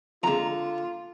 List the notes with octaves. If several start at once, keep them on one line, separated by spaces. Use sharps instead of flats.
F2 D3 G#3 F4 A#5